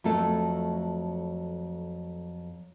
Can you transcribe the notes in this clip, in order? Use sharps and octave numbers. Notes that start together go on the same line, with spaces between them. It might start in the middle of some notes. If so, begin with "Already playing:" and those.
F2 F#3 A3 A4